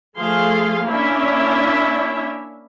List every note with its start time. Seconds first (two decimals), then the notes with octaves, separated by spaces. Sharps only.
0.17 F3 A3 G#4 F5 C6
0.87 A#3 C#4 D4 E4 E5